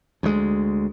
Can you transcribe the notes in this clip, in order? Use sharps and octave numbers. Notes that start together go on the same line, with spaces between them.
D2 G#3